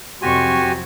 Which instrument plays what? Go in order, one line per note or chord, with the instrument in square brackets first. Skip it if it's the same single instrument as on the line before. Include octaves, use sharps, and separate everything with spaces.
[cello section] F2 C3 F#3 [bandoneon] F#4 G4 G#5 [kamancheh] C6 C#6